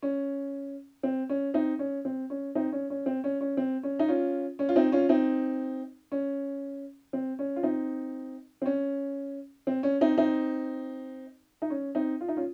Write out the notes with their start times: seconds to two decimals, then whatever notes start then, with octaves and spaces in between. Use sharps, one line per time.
0.03 C#4
1.03 C4
1.29 C#4
1.54 C4 D#4
1.79 C#4
2.05 C4
2.30 C#4
2.55 C4 D#4
2.72 C#4
2.90 C#4
3.06 C4
3.24 C#4
3.41 C#4
3.57 C4
3.83 C#4
3.99 D#4
4.08 C#4 F4
4.59 C#4
4.69 F4
4.76 C4 D#4
4.92 C#4 F4
5.09 C4 D#4
6.12 C#4
7.13 C4
7.39 C#4
7.56 F4
7.63 C4 D#4
8.62 C4
8.66 C#4
9.67 C4
9.83 C#4
10.01 C4 D#4
10.18 C4 D#4
11.62 D#4
11.70 C#4
11.95 C4 D#4
12.21 F4
12.28 D#4
12.37 C#4 F4